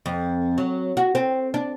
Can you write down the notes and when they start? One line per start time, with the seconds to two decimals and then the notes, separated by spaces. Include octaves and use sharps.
0.06 F2
0.58 F#3
0.97 F#4
1.15 C4
1.54 D4